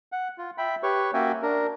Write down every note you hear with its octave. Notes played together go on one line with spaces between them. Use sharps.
F#5
F4
E5 G5 B5
G4 B4 C#5 C#6
A#3 C#4 F#4 E5 G5 G#5
D4 A#4